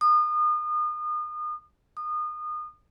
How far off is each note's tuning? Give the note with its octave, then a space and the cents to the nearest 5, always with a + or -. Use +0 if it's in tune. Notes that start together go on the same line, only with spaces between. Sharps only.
D#6 -35
D#6 -30